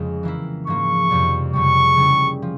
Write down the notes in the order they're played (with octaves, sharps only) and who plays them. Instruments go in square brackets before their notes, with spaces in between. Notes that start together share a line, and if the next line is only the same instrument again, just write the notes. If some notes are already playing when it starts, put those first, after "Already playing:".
Already playing: [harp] F2 C#3 G#3
E3 A#3 E4
[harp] G#2 F3 A#3 [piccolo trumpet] C#6
[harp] F2 C3 G3
[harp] F2 C#3 G3 [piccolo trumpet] C#6
[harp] C#3 G3 C#4 E4
F3